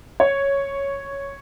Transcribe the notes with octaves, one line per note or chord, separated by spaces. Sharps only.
C#5